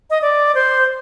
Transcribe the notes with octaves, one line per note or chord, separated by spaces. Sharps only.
D#5
D5
C5